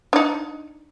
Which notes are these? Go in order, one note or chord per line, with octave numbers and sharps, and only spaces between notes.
D4 D#4